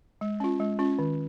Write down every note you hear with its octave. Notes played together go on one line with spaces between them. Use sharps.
G#3
C#4 F4
G#3
C#4 F4
D#3